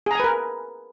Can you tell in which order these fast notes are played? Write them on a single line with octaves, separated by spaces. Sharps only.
G#4 A#5 G#5 B4 A#4